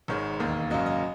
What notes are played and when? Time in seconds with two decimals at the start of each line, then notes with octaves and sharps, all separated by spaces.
0.08 G#1 G#2 D#3 G#3 C#5
0.40 E1 D#2 D#3 A#3
0.70 G#1 F#2 C#3 F#3 A#3 D#5
0.86 D#5